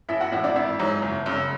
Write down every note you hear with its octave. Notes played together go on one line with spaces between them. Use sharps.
A1 E4 E5
F#4 F#5
A2 E3 E4 E5
D4 D5
G#1 E4 E5
G#2 F#3
F#1
F#2 C#3